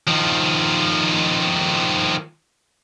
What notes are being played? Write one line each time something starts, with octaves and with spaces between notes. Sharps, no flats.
D#3 F3